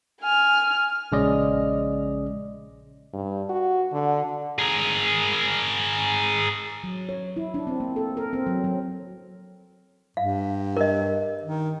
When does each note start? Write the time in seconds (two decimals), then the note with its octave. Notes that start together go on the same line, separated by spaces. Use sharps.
0.22 G#5 F6
1.12 A#1 C#3 G#3 C#4 D5 D#5
3.14 G2
3.50 F#4
3.93 D3
4.59 G#4 A#4
6.84 F#3
7.09 C#5
7.37 E4
7.54 D4
7.67 C4
7.80 A#3
7.96 A4
8.17 A#4
8.33 C4
8.47 F#3
8.64 F#3
10.17 G2 F5
10.76 A#4 D#5
11.43 D#3